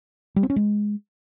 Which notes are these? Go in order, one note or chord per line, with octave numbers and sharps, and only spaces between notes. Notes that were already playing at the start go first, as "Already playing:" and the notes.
G3
C4
C#4
G#3